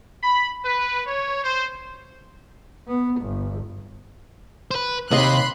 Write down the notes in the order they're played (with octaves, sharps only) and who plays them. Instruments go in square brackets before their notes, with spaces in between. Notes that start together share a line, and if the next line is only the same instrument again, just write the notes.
[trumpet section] B5
B4
C#5
C5
[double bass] B3
G1
[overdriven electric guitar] B4 C5
[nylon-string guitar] D#2 D#5 [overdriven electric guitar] C3 [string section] B5 C6 F#6